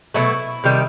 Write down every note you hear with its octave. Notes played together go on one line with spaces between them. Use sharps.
B2 F#3 A3 E4
C3 D#3 G3